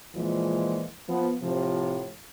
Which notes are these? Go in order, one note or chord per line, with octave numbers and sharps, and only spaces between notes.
A#2 E3 F3 G#3
F3 B3
A2 C3 F3